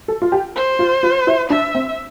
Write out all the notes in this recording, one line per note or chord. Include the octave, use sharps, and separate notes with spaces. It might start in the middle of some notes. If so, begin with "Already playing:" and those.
A4
F4
G4
C5
F4
F4
E4
D4 E5
C4